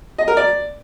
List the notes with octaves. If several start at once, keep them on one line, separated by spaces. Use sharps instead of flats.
D#5
A#4
D5